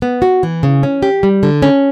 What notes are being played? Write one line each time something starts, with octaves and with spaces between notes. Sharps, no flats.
B3
F#4
E3
C#3
C#4
G4
G3
D3
C#4